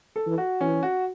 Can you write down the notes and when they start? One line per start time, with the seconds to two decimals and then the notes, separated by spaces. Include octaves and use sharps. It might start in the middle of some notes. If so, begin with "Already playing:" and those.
0.16 A4
0.26 E3
0.38 F#4
0.61 E3 C#4
0.83 F#4